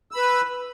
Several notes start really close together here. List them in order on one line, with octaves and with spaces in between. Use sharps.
E6 B5 B4